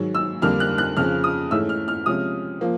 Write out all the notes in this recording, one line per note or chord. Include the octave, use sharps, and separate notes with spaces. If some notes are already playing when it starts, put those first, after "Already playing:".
Already playing: G#2 D#3 F#3
E6
F2 D3 G3 A#3 D4 F6
F#6
F#6
F2 C#3 F3 F6
D#6
G#2 E3 A3 C#4 E6
F6
F6
C3 F3 G#3 C#4 D#6
F3 A#3